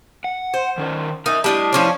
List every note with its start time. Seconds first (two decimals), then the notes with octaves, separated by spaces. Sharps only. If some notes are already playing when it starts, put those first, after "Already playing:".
0.24 F#5
0.54 C5
0.78 D#3 C#4 A#4
1.26 D#4 A#4 E5
1.44 G3 D4 E4 D#5 A5
1.73 F3 C#4 D4